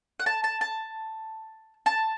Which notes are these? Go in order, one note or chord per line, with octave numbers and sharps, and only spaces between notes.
F#5
A5
A5
A5
A5